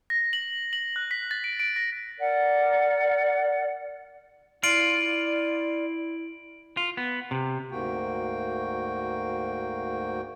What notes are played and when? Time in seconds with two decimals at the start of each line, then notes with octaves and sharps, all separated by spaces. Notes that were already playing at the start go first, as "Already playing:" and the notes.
0.10 A#6
0.33 F#7
0.73 F#7
0.96 F#6
1.11 B6
1.31 A6
1.44 D7
1.60 D7
1.76 A#6
2.18 A#4 D5 F#5
4.64 E4 F4 D5 D7 F#7
6.77 F4
6.97 B3
7.31 C3
7.71 D2 G#2 A#3 F#4 G5